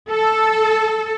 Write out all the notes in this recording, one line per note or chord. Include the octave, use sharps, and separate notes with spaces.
A4